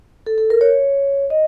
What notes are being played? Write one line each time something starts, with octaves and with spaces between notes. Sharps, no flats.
A4
A4
A#4
C#5
D#5